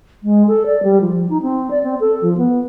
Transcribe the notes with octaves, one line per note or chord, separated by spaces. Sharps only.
G#3
A4
D5
G3
F3
D#4
C4
D5
C4
A4
F3
B3